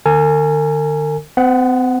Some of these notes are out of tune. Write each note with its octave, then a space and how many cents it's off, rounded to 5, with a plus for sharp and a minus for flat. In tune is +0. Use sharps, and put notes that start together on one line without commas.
D3 +40 A#4 -45 G#5 +0
C4 -40 F#5 +0